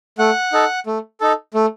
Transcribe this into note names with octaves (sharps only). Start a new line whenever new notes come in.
A3 F#5
D#4 A4
A3
D#4 A4
A3